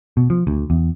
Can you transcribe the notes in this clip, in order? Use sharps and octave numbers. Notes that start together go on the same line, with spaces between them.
B2
F3
D2
E2